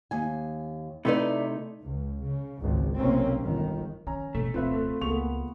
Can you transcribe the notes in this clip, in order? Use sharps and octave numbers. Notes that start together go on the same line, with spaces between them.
D#2 G#5
C3 A3 D#4 E4 B4 D5
C#2
C#3
G#1 C#2
F1 B1 A#3 C4 C#4
G1 D#3
D#3 C#4 G#5 A#5
G2 B2 A3
D1 B2 C4 F4 B4 E5
C#2 A#3 B3 G#4 C#6 F7